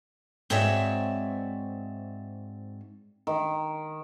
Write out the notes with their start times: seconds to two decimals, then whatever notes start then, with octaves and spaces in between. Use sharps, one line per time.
0.50 G#2 C4 F#4 C#5 D5 E5
3.27 D#3